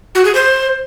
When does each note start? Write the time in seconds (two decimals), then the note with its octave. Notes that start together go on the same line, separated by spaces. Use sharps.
0.15 F#4
0.25 G#4
0.35 C5